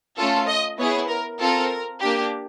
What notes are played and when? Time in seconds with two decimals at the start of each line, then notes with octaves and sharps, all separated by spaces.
0.17 A3 C#4 F4 A4
0.48 D#5
0.78 B3 E4 G#4 C#5
1.09 A#4
1.39 C4 F4 A4 A#4
2.01 A#3 D4 G4